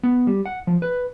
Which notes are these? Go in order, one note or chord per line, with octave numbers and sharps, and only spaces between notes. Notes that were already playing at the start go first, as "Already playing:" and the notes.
B3
G3
F#5
F3
B4